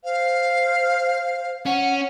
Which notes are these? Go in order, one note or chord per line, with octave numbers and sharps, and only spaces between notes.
C5 F5
C#4 F#5